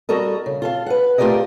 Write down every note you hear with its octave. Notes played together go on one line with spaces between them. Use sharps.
G3 F#4 A4 A#4 D#5
C#3
F4 A4 F5
B4 F#5
A3 F4 G4 A#4 D5 D#5